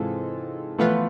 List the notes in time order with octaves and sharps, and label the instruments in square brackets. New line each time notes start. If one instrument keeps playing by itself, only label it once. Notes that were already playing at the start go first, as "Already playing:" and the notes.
Already playing: [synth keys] G#2 G#3 C4 F4 A4 [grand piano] C3 E3
[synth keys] A2 E3 B3 F4 B4 [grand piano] F3 A3